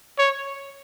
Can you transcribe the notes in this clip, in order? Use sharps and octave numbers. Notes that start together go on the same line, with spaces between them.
C#5